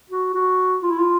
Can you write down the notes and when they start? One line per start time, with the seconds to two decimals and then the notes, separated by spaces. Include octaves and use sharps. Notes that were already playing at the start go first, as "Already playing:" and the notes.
0.09 F#4
0.34 F#4
0.82 F4
0.91 E4
0.99 F4